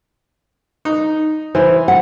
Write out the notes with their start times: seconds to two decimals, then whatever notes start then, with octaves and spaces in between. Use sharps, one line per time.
0.85 D#4
1.55 E3 C5
1.88 F#5